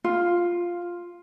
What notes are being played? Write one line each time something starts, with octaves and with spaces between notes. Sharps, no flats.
F4